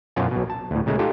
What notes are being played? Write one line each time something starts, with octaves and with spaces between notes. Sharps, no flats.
F#2 B2 F4 C#5 G#5
B1 B2
A5
D2 A2
A#2 C#3 G#3 A3
D#4 F4 G4 A4